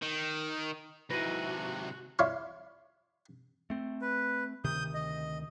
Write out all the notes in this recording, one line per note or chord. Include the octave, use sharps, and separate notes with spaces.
D#3
G#2 C3 E4 F#4 B4 A#6 D#7
E4 C#5 D5 F5 C6 C#6
A3 C4
B4
D2 C3 D#3 D#6 G6
D#5